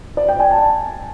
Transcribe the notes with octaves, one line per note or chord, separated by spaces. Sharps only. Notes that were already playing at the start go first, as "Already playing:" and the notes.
D5
G5
G#5
A5